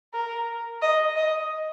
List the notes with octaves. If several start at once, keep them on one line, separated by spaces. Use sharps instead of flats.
A#4
D#5
D#5